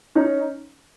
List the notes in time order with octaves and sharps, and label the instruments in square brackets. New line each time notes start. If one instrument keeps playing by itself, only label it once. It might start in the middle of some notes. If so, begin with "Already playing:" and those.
[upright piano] C#4 D#4